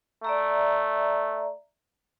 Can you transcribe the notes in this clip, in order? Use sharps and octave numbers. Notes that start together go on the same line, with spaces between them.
A3 D5 E5 A#5